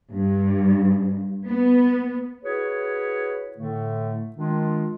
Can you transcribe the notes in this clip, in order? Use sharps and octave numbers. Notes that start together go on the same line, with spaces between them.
G2
B3
E4 F#4 G#4 B4 C#5
A2 D3 A3
D#3 G#3 D4 F4